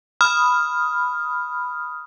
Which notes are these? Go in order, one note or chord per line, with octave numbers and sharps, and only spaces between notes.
B5 D#6 F6